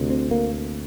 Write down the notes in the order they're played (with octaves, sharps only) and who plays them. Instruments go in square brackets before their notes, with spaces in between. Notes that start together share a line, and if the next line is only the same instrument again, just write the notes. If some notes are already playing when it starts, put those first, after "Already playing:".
Already playing: [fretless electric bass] D2 C3
C4
A#3